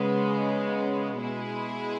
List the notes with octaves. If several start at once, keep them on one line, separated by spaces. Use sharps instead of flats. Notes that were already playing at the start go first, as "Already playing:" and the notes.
Already playing: C#3 G#3 B3
B2 G#3 E4 G#4